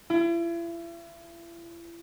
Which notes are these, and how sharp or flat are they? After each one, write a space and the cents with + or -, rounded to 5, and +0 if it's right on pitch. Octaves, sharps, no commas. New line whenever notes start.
E4 +40